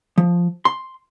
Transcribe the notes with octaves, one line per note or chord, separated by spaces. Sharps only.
F3
C6